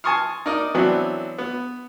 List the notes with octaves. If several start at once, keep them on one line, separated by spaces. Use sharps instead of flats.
G#5 A5 C6 C#6 D#6 F6
D#4 A#4 D5 D#5
E3 F#3 B3 C4 D4
B3